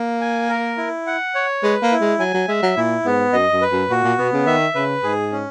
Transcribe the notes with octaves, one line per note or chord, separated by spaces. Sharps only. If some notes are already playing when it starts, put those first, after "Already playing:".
Already playing: A#3
G#5
A#4
E4
F#5
C#5
G#3 B4
A#3
E4
G#3
F#3 G#5
F#3
G#3 E5
F#3
A#2 E4
G#2 B3
F#2 D#5
F#2
B4
F#2
A#2 F#4
A#2
B2 B3
C#3
D#3 E5
C#3 B4
G#2 G#4
C#4